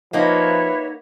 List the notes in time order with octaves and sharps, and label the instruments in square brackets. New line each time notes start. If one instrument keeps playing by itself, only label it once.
[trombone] F3 [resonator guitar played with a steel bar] A#3 D#4 F#4 [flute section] B4 C#5 E5